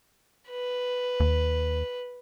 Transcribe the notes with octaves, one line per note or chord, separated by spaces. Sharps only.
B4
D#2